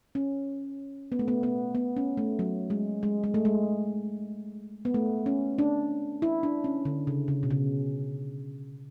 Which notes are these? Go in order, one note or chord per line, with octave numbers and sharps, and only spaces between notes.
C#4
B3
A3
B3
B3
B3
C#4
A3
F#3
G#3
G#3
G#3
A3
G#3
B3
A3
C#4
D4
E4
D4
C#4
D3
C#3
C#3
B2
C#3